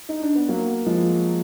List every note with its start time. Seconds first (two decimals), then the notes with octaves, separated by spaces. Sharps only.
0.09 D#4
0.22 D4
0.35 B3
0.49 F#3 A#3
0.86 F3 G#3